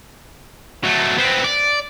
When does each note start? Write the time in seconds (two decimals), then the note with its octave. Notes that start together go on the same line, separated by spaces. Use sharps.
0.84 F#3 A3
1.18 B3 C4
1.44 D5